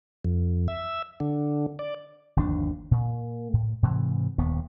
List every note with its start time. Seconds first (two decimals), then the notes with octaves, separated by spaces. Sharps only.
0.25 F2
0.68 E5
1.20 D3
1.79 D5
2.36 G1 D#2 F3 D4
2.91 A#2
3.53 A2
3.83 G#2 C3 E3
4.38 D#1 D#2 B3